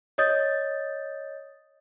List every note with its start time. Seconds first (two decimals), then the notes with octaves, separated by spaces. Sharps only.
0.18 C#5 D#5 D#6 G6 A6